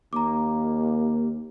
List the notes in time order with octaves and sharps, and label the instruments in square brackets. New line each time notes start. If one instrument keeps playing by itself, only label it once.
[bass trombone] D#2 [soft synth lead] A#3 [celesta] A#5 D6